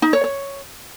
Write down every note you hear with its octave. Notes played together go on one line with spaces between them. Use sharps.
D#4
C#5
C#5